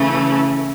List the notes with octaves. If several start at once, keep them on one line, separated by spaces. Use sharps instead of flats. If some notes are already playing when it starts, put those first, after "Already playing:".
Already playing: C#3 E3 A3